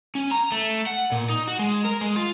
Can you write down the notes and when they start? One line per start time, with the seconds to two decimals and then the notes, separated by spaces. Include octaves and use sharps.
0.15 C#4
0.31 A#5
0.52 A3
0.86 F#5
1.12 A#2
1.30 D#4
1.48 F#4
1.59 G#3
1.84 A#4
2.01 G#3
2.16 F4